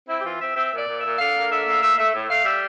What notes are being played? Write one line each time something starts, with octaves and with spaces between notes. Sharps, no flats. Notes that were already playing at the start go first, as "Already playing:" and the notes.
C4 E4
G4
E3 F4
C4 E5
C4 E5
A#2 D5
A#2
E5
A#2
D3 F5
A#3
D3 E5
A#3
A3 E5
A3 E5
A2
A3 F5
G3 E5